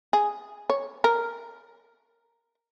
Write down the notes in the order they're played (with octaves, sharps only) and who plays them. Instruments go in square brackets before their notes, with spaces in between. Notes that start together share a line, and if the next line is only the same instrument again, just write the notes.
[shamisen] G#4
C#5
A#4